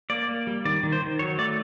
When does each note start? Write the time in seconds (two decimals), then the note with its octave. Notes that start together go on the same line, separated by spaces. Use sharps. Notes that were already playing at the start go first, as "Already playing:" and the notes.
0.10 A#3 D5
0.29 A#3
0.47 G3
0.65 D#3 D5
0.83 D#3
0.92 C5
1.02 D#3
1.19 F#3 C#5
1.38 A3 D5